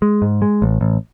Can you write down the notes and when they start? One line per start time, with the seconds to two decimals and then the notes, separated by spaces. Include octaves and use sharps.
0.02 G#3
0.22 G#2
0.42 G#3
0.62 A1
0.81 A1